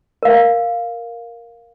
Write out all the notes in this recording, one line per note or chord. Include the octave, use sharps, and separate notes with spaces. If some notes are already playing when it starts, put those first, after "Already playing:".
A#4 F5